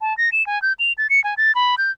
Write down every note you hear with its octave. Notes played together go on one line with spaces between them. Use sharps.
A5
A#6
E7
G#5
G6
F7
A6
C#7
G#5
A6
B5
G6